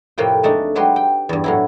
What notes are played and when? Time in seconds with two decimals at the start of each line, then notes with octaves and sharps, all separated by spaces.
0.18 F2 A2 C3 A#3 B4 G5
0.43 G#3 A3 D4 D#4
0.75 F#3 G#3 G4 B4 C6
0.96 G5
1.29 E2 G2
1.44 A2 F#3 E4